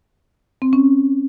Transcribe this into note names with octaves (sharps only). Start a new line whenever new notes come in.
C4
C#4